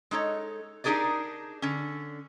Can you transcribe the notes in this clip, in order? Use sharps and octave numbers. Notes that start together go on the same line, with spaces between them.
G#3 D#4 A4 C#5
D4 D#4 G4 G#4 A#4 D5
D3 C#4